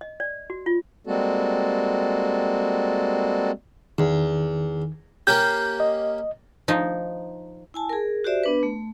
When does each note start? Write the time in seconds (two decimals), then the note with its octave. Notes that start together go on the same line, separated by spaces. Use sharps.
0.01 D#5
0.20 D5
0.50 F#4
0.66 F4
1.07 G3 G#3 A#3 C4 F#4 A4
3.98 E2 D#3
5.27 A#3 C#4 G4 G6
5.80 D#5
6.68 F3 D#4
7.74 E4 G#5 A5
7.89 G#4 A#4
8.24 F#4 G4 C5 D5 E5
8.43 B3 D4 B4
8.63 A3